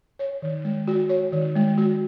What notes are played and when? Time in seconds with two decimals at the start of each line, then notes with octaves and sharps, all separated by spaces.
0.19 C#5
0.42 D#3
0.64 G#3
0.87 F#4
1.09 C#5
1.32 D#3
1.55 G#3
1.78 F#4